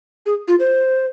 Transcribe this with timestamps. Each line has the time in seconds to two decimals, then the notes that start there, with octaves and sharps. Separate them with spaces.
0.26 G#4
0.48 F4
0.60 C5